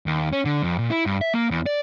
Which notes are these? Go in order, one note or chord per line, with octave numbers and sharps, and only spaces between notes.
D#2
C#4
D3
F2
A#2
E4
G2
E5
A#3
E2
D5